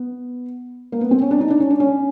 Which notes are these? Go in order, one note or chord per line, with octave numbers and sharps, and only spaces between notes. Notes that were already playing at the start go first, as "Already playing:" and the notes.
Already playing: B3
A#3
B3
C4
C#4
D4
D#4
D4
C#4
D4
C#4